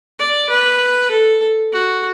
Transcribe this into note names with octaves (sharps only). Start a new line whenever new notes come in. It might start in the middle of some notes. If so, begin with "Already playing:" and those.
D5
B4
A4
F#4